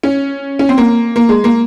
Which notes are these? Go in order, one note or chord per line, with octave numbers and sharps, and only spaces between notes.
C#4
C#4
C4
A#3
A#3
G#3
A#3